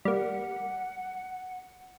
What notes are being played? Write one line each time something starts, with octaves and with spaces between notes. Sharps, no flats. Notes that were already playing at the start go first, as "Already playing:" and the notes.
G3 A#3 F#5